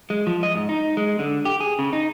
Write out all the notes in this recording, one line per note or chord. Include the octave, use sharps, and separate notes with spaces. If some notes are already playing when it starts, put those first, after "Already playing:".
G#3
F3
D#5
G#2
D#4
G#3
D3
G4
G#4
C#3
D#4